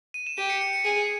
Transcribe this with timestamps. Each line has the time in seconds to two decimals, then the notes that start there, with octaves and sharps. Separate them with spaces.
0.14 D#7
0.27 E7
0.38 G4 D#7
0.50 C#7
0.61 C#7
0.73 C#7
0.85 G#4 D#7